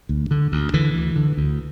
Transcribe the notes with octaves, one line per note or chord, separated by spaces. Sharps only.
D2
D3
D2
D3 E3
D2
D3
D2